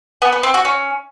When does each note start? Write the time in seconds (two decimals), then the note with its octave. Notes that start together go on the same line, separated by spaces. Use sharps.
0.22 B3
0.33 B3
0.43 C4
0.54 F#4
0.65 C#4